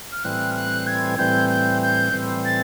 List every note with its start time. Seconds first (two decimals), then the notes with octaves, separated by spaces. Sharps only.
0.12 F6
0.24 A2 E3 G3 C4 F#6
0.51 F6
0.56 F#6
0.87 G#6
1.18 A2 E3 G3 C4 G6
1.50 G6
1.82 G6
2.13 A2 E3 G3 C4
2.45 A6